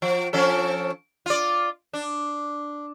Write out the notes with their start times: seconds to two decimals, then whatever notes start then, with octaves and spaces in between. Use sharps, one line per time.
0.02 F3
0.33 F3 C#4 A4
1.26 F4 D5
1.93 D4